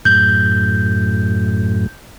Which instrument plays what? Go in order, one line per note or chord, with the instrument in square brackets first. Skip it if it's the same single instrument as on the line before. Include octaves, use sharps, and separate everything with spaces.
[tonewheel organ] F#2 A2 [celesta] G6